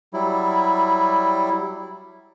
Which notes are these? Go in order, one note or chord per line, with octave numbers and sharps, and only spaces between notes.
F#3 G3 E4